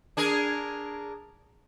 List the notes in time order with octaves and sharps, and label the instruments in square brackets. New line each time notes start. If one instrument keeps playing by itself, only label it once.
[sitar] D4 G#4 A#4